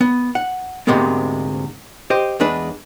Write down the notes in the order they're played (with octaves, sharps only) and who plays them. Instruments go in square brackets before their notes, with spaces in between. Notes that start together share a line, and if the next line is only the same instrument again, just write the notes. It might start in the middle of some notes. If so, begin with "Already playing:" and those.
[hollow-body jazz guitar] B3
F#5
D2 G#2 C3 G#3 A#3 B3
G4 C5 D#5
E2 G#3 D4 B4